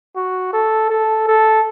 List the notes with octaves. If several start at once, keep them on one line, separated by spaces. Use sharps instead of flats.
F#4
A4
A4
A4